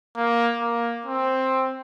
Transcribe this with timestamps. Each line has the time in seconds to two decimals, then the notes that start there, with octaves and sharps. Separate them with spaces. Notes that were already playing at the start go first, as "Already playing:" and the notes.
0.16 A#3
0.61 A#3
1.07 C4